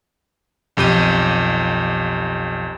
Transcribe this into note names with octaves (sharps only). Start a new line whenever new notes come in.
B1 F2 G4 G6 D#7